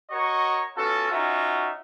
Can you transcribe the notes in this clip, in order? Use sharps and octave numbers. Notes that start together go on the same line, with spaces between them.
F#4 A#4 C#5 D#5 C#6
B3 C#4 F4 F#4 A4
C#4 D#4 F4 F#4 E5 F#5